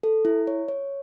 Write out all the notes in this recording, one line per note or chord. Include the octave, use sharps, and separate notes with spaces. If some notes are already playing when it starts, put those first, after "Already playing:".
A4
E4
C#5
C#5